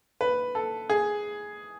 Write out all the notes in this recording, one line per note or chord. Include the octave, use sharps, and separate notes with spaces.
B4
A4
G#4